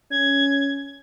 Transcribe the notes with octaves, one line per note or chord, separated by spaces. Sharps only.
C#4 G#6